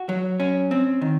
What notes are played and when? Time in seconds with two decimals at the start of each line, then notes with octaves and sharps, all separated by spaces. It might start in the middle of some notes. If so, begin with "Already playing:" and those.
Already playing: F#4
0.09 F#3
0.40 C#4
0.71 C4
1.02 D#3